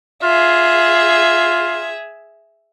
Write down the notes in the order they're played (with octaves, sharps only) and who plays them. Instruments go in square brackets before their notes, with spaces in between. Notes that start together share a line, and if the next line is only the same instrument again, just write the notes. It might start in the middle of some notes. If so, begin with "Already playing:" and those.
[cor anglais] F4 [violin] G#4 E5